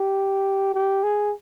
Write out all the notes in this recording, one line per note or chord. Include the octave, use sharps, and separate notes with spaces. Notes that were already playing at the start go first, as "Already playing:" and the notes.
Already playing: G4
G4
G#4